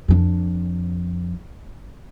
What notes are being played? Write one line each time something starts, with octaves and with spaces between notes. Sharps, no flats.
F2 D4